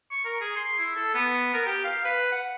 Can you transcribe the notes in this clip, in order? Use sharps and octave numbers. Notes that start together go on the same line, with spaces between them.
C#6
A#4
G#4
C6
E4
A4
B3
A#4
G4
F5
B4
F#5